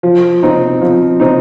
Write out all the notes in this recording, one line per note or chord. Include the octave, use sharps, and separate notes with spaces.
F3
C4 D#4
F3
C4 D#4